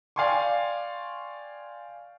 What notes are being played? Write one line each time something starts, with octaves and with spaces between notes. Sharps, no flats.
D5 F5 G5 G#5 C6 C#6